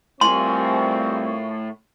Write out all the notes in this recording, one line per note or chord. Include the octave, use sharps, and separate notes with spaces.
A2 G3 C4 F4 A#4 G#5 C6 C#6